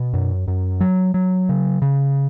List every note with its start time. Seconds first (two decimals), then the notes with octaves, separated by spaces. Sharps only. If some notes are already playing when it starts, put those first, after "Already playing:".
Already playing: B2
0.13 F#2
0.48 F#2
0.80 F#3
1.14 F#3
1.49 C#3
1.82 C#3